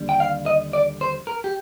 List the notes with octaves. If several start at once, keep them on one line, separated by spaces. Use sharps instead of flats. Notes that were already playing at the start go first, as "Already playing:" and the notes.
Already playing: D#2 D3 G3
G5
F5
D#5
D5
C5
A#4
G4